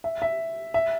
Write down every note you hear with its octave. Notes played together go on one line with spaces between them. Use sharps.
E5
E5
E5